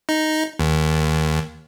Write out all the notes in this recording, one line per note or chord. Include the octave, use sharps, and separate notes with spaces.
D#4
D#2